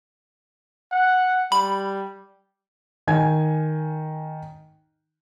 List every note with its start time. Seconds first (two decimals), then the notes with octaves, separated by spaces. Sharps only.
0.92 F#5
1.52 G3 B5
3.07 D#3 G#5 G#6